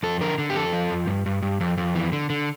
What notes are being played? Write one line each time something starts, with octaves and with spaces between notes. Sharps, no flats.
F2 A4
D3 A#4
D3
G4
F2 A4
F3
F2
G2
G2
G2
F2
F2
E3
D3
D3